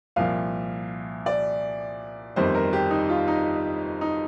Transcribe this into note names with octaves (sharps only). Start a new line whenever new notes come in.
C2 A#2 F3 F5
D5
G1 F2 D#3 G3 C5
A#4
G4
D#4
F4
D#4
D#4